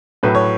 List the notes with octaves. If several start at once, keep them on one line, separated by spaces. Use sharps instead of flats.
A2 F#3 A3 B4
C#5